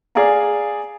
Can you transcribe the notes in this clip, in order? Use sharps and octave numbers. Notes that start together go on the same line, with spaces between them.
G#4 D5 F5 G#5 A#5